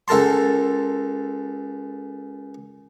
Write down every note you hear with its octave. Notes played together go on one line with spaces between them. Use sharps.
C#2 A4 A#4 A5 C6